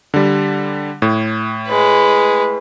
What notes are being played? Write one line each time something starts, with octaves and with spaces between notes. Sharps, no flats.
D3 G3
A2
G#3 B4